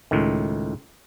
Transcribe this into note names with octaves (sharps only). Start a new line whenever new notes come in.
C#2 A2 D#3